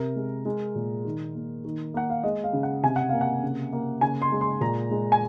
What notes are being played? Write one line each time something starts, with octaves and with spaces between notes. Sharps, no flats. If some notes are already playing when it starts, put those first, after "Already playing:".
Already playing: C3 A#4
G#3
G#3
A#2
D#3
A#3
D#3
A#3 F#5
F5
G#3 D#5
F5
C#3
F#5
C3 G#5
F#5
A#3 F5
F#5
C#3
A#3
C#3 G#5
C6
G#3
C6
A#2 A#5
G#3
G#5